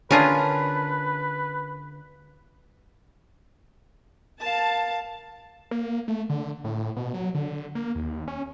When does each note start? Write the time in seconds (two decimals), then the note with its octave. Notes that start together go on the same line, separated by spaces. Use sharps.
0.11 D3 C#4 D4 F4 G#4 A#4 B4
4.41 A#4 F5 A5
5.71 A#3
6.08 A3
6.29 D3
6.64 A2
6.96 B2
7.14 F#3
7.35 D3
7.75 A#3
7.95 D#2
8.28 C#4